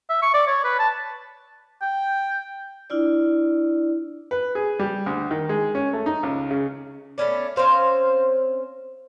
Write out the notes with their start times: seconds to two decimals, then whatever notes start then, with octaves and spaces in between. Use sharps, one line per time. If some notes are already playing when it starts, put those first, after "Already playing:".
0.09 E5
0.22 C#6
0.34 D5
0.47 C#5
0.64 B4
0.79 A5
1.82 G5
2.90 D4 E4 F4 D5
4.31 B4
4.55 G#4
4.79 G3
5.06 D2
5.31 D#3
5.49 G#3
5.75 C#4
5.93 A3
6.06 D#4
6.23 C#2
6.51 C#3
7.18 A3 B3 C#4 D5
7.56 C4 C#4 C5 F5